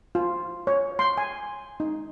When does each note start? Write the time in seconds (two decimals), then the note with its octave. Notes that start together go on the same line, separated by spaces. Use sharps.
0.15 F4
0.67 C#5
0.99 C6
1.18 G#5
1.80 D#4